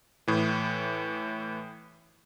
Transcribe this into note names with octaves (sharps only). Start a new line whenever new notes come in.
A2 E3